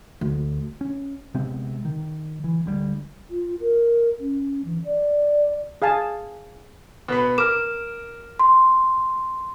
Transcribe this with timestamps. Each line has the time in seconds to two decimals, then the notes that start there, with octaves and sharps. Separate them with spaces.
0.21 D2
0.81 C#4
1.34 C3 G#3 B3 C4
1.85 D#3
2.44 E3
2.66 D2 G3
3.30 F4
3.61 A#4
4.20 C#4
4.65 E3
4.85 D5
5.82 G#4 F5 G#5 A5
7.08 B2 B3 B4
7.38 A#4 D6 F6 E7
8.39 C6